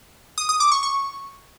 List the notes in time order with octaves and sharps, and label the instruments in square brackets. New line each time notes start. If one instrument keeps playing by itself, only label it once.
[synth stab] D#6
D#6
D6
C#6
C#6